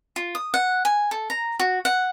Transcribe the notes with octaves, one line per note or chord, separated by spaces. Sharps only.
F4
D#6
F#5
G#5
A4
A#5
F#4
F#5